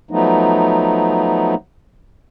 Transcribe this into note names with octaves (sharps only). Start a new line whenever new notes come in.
F3 F#3 A3 B3 D#4